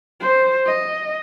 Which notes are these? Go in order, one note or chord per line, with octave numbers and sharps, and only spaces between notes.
C5
D#5